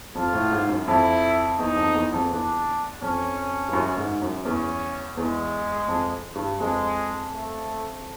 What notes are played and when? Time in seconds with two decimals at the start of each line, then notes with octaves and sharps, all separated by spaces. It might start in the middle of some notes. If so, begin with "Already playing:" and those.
0.15 F2 F4
0.33 A2
0.52 G#2
0.69 F#2
0.86 F2 E4
1.58 E2 D#4
1.76 F2
1.94 E2
2.12 F2
2.30 E2 D4
3.02 F2 C#4
3.68 G2
3.73 F#2
3.98 G#2
4.21 F#2
4.45 E2 C#4
5.17 E2 G#3
5.88 F2
6.35 G2
6.60 F2 G#3
7.32 A3